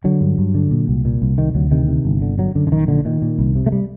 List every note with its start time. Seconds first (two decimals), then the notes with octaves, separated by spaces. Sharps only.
0.04 D3 F#3
0.21 G2
0.38 G2
0.55 D3
0.71 A#2
0.88 C2
1.05 A#2
1.22 C2
1.38 C3 D#3
1.55 D2 F#3
1.71 C3 D#3
1.88 C3
2.05 G1
2.22 D3
2.38 D3 F#3
2.55 F#2 D3
2.67 D3
2.72 A#1 D#3
2.88 A#2 D3
3.05 A#2 D#3
3.22 A#2
3.39 C2
3.55 C3
3.66 A3
3.72 G3